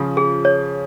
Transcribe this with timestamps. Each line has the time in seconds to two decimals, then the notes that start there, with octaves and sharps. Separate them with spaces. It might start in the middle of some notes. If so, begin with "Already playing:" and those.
Already playing: C#3 F3 F4
0.17 G#4
0.45 C#5